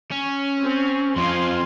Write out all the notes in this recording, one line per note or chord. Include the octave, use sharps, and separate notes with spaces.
C#4
C4
F2 F3 F5 G#5 C6